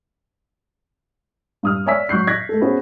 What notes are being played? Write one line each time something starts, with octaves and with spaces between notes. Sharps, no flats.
G2 D#6 F6
C#5 D5 E5 G#5 E6 B6
F#3 C#6 F#6 G6 C7
F#6 G#6 A#6 B6
A3 A4
B3 C#4 F#4 G#4 C5